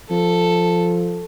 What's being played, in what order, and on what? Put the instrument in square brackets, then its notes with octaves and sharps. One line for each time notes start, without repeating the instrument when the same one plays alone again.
[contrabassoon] F3 [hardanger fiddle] A4